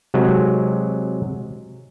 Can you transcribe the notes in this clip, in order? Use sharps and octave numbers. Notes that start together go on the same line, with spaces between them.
C3 F#3 G#3